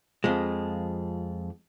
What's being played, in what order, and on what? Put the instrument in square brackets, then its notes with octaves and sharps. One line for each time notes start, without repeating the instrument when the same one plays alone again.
[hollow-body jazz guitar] F2 F3 G#3